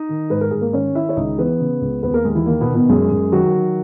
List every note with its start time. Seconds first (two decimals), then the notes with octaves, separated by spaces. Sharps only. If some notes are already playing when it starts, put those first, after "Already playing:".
Already playing: D#4 D#5
0.09 D#3
0.30 G#2 B4
0.41 A#4
0.51 G#2 G#4
0.61 A#3 A#4
0.73 D#3 C#4 C#5
0.95 D#3 E4 E5
1.09 C#5
1.16 C#2 D#4 D#5
1.38 E3 B3 B4
1.60 C#3
1.82 C#2
2.03 D#2 B3 B4
2.14 A#3 A#4
2.25 D#2 G#3 G#4
2.35 E3 E4
2.46 D#3 A#3
2.61 B2 B3
2.67 D#3
2.75 B2 B3
2.89 F#2 G#3 G#4
3.11 F#2
3.32 D#3 F#3 F#4
3.54 D#3